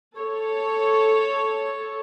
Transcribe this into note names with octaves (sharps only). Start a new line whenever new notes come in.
A4 C#5